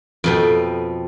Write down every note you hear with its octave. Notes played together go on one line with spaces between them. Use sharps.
F2 B2 G5